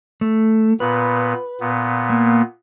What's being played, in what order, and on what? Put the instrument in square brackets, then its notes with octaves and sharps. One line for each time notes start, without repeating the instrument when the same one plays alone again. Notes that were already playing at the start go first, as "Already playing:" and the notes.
[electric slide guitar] A3
[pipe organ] A#2 B3 [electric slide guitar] B4
[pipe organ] A#2 B3
[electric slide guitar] A#3